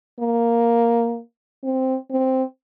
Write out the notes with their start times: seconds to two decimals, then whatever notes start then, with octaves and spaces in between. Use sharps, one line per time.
0.20 A#3
1.64 C4
2.10 C4